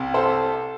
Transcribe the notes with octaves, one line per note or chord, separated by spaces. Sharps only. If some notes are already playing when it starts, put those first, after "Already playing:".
Already playing: C2 C3
A4 C5